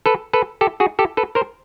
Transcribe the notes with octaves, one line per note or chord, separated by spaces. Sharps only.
A4 B4
A4 B4
G4 A4
F#4 G#4
G4 A4
A4 B4
A#4 C5